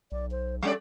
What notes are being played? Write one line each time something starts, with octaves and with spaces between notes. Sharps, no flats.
B1 D5
C5
G3 C#4 A4 D5